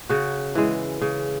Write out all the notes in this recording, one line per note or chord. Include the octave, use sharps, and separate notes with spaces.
C#3 F#4
E3 G#3
C#3